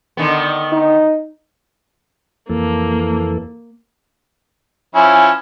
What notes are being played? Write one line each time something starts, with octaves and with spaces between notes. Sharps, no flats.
D3 D#3 B3
D#4
F2 E3 A#3 A4
F3 C#4 E4 G#5